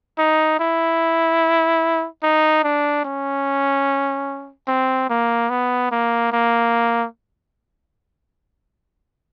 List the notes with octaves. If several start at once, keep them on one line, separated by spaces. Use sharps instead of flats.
D#4
E4
D#4
D4
C#4
C4
A#3
B3
A#3
A#3